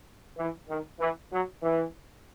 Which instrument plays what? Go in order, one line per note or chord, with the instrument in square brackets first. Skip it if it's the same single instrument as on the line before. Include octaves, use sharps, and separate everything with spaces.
[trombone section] E3
D#3
E3
F#3
E3